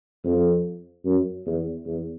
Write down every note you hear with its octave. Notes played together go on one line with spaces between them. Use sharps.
F2
F#2
E2
E2